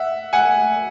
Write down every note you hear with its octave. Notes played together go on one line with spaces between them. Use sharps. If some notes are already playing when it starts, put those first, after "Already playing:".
Already playing: E5 F#5
F#5 G#5